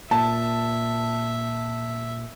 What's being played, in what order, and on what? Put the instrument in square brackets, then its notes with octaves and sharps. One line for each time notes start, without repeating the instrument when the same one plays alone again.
[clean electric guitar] A#2 [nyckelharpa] E5 [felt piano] A5